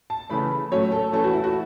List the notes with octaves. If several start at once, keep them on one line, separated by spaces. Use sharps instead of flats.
A5
C#3 E3 A3 B5
A2 F#3 A3 C#4 C#5
A4
E3 A3 C#4 A4
F#4
E4
F#4